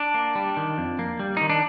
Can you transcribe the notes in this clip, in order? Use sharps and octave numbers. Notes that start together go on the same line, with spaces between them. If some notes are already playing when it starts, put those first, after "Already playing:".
Already playing: D4
A#3
G3
D#3
F2
A#3
G3
D#3 D#4
D4